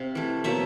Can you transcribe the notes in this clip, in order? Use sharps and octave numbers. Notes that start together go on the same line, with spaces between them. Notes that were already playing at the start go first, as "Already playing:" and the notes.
Already playing: C3 F5
E3 A3
B2 F#3 A#3 E5